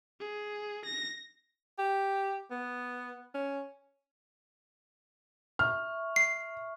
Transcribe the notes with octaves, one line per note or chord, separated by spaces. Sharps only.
G#4
A#6
G4
B3
C#4
E5 C#6 F6
C7